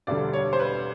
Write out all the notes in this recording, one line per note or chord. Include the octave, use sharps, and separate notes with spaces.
E1 D2 D3 G3 D5
C#5
C5
B4